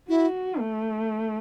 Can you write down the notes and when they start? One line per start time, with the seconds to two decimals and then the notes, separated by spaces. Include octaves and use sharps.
0.09 E4 F#4
0.59 A3